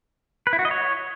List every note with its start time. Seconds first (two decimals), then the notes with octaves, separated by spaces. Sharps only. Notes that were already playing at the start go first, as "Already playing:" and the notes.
0.47 B4
0.53 E4
0.59 F#4
0.65 D#5
0.71 C#5